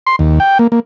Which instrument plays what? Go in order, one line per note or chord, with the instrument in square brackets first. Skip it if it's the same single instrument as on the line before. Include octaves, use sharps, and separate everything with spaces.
[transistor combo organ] C6
D#2
G5
A#3
A#3